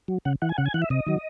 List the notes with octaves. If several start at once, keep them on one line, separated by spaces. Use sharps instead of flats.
F#3
C#3 F#5
E3 F#5
G#5
C#3 F#5
G#5
E3 F#5
E5
C3 D#5
D#3 F#3